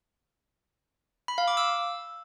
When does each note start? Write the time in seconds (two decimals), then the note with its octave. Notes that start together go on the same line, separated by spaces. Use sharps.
1.28 B5
1.38 F5
1.48 D6
1.57 E6